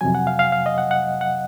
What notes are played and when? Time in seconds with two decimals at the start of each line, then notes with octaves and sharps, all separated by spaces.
0.01 F2 C3 F#3 G#5
0.15 F#5
0.27 F5
0.39 F5
0.52 F5
0.66 D#5
0.78 F#5
0.91 F#5
1.21 F#5